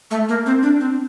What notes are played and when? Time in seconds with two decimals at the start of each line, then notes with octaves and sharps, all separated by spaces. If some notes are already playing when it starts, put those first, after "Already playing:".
0.11 A3
0.29 A#3
0.46 C4
0.63 D4
0.80 C4